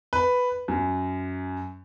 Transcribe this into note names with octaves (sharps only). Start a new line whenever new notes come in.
B4
F#2